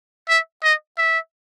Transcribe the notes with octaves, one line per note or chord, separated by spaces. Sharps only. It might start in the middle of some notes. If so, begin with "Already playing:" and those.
E5
D#5
E5